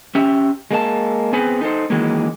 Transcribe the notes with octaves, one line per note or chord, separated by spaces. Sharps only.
C#4 G4 E5
G#3 A#3 D4 A5
B3 C4 G#4 B4
D#4 A4 C5
D#3 E3 F#3 G#3 A#3